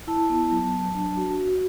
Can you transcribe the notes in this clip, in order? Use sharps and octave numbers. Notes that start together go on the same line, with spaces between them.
E4 A5
B3
F#3
F#3
D4
F#4
F#4